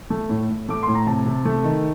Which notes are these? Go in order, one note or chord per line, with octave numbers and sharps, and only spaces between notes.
A3
A2
A2
A3 D6
A2 C6
A#5
C3 A5
C3
A3
D#3